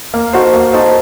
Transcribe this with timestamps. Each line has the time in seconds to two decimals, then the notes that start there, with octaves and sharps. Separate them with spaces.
0.14 A#3
0.33 D#4 F#4 A4 C5
0.54 A#3
0.73 D#4 F#4 A4 C5